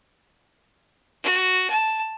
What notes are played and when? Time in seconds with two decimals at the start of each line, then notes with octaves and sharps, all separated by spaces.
1.23 F#4
1.70 A5